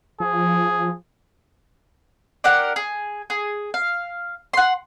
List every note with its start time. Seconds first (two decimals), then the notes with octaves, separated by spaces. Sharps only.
0.20 F3 G#4
2.44 D4 G4 A#4 F#5
2.76 G#4
3.30 G#4
3.74 F5
4.53 F#5 C6